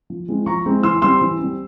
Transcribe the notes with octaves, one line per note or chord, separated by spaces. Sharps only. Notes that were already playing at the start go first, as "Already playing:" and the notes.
F3
G#3 C4 E4
F3 A#5 C#6
G#3 C4 E4
E3 C6 E6
G3 C4 C6 E6
E3
G3 C4